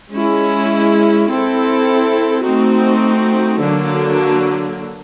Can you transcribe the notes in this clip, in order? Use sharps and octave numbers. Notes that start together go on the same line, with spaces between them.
G#3 C#4 E4
C4 E4 A4
A3 C4 D#4 F#4
D3 F#3 A#3 D4